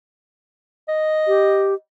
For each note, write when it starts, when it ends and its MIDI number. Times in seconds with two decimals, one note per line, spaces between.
0.88 1.77 75
1.28 1.74 67